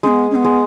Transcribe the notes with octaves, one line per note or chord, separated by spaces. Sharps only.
G#3 B3 C#4
C#4
B3
G#3